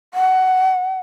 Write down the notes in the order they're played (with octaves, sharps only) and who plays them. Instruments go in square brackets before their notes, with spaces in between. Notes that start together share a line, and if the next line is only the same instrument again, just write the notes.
[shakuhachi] F#5